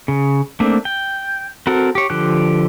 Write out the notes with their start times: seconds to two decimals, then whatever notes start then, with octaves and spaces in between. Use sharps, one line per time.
0.08 C#3
0.60 A3 A#3 C4 D4
0.85 G5
1.67 C4 F#4 A4 A#4
1.95 G4 C#5
2.10 D3 F3 G4 F#6